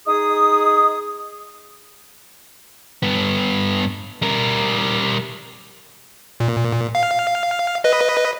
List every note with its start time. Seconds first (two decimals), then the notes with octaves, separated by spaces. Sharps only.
0.07 D#4 G#4 D#6
3.03 G2 B3
4.22 G3 A#4
6.40 A#2
6.95 F5
7.84 B4 D#5